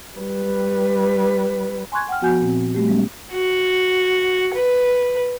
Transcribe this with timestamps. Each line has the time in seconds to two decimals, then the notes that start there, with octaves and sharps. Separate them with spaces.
0.18 G3 B4
1.92 G#5 C6 C#6 F#6 G#6
2.09 F#5 G5 F6
2.21 F3 B3 F#4 F#5 G#5 G6
2.41 A#2 C4
2.75 G3 A3 G4
2.87 G3 G#3 B3 C#4
3.32 F#4
4.54 B4